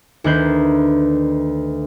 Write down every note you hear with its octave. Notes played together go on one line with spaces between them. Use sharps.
D2 D#3 B4 G6 C7